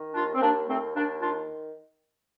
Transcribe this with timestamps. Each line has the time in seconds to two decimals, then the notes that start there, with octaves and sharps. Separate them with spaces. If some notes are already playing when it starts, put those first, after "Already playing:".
Already playing: D#3
0.14 D#2 D4 F4
0.34 C4
0.41 D#2 A#3 D4
0.68 D#2 A3 C4
0.95 D#2 A#3 D4
1.22 D#3 D4 F4